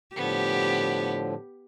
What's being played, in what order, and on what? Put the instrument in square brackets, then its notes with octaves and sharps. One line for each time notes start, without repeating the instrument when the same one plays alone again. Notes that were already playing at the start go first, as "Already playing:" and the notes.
[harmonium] A2 D3 F3 [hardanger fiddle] B3 [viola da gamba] G4